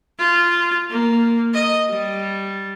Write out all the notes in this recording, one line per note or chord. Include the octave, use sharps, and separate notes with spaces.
F4
A#3
D#5
G3